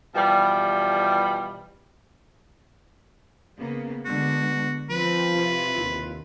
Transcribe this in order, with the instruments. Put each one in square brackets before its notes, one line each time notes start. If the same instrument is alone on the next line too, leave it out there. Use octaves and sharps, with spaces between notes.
[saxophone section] B2 E3 F3 G3
[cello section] C#3 A#3 B3
[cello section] D3 G#3 [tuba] B3 [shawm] F#4
[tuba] F3 [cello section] C4 [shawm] B4
[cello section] C3 E4 F4
[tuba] D#2